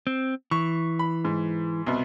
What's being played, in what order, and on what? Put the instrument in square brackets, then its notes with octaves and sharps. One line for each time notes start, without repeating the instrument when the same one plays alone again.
[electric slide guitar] C4
[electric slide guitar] E3 [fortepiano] C#6
[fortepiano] B5
G#2
C2 B2